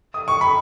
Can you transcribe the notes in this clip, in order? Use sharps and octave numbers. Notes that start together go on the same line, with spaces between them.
D#6
C#6
B5